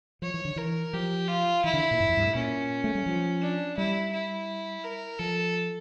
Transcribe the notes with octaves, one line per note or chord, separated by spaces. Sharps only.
F3 C#5
E3
D3
E3 A#4
F3 G4
F4
E3 E4
D3
A#2
G2
F2
G2
A2
A#2 C#4
A3
G3
F3
D4
G3 E4
E4
A#4
F3 A4